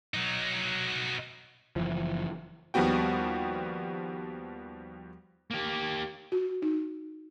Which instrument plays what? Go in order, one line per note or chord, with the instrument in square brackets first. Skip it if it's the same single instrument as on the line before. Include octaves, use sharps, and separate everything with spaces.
[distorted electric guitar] F#3 D#4
[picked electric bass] F#1 E3 F3
[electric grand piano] D#2 F3 G3 B3 F#4 G5
[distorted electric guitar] A#3 G4
[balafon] F#4
D#4